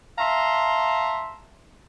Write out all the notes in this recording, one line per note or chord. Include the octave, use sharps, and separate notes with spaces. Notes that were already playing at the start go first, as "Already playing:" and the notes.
E5 F5 A5 A#5 C6